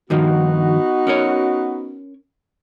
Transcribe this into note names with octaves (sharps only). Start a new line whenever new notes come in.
G2 D#3 F3 B3 D#4 F#4
C#4 A#4 C#5